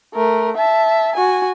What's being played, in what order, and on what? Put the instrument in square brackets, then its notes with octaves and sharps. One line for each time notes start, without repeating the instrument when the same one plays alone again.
[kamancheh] A3 A#4
E5 A5
F#4 G#5